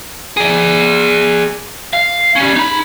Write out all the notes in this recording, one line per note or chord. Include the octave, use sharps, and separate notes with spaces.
G#4 D5
F5
G3 C#4
D#4 B5